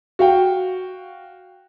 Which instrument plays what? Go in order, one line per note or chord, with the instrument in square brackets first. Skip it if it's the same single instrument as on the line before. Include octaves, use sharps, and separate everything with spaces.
[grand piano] F#4 F5 G5